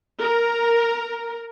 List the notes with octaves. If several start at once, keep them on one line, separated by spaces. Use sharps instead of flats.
A#4